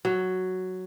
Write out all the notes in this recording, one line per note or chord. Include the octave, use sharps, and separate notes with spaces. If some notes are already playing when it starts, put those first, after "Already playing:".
F#3